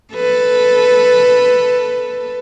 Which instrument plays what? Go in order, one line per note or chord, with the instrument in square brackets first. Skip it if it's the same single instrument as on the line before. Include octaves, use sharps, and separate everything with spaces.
[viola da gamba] A4 B4